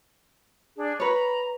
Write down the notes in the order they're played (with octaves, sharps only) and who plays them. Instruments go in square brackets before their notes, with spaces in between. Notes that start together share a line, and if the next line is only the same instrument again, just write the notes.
[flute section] D4 G#4
[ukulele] B4 C#5 [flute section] A#5 B5